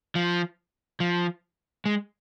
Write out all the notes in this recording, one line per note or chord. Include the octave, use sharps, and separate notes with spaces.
F3
F3
G#3